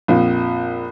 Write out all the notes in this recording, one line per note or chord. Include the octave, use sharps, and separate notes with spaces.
A#1 F2 A#2